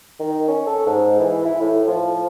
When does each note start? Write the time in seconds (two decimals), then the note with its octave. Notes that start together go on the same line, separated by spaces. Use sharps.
0.20 D#3
0.48 C#4
0.66 A4
0.86 G#2
1.19 E3
1.45 E4
1.61 A2
1.87 F3